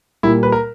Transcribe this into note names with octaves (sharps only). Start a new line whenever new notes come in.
A#2 G3 A#3 E4
B4
A#4